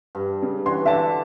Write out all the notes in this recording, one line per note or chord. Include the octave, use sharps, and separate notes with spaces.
G2
C#3
E3 F#4 C#5 C6
D3 E5 A5 D6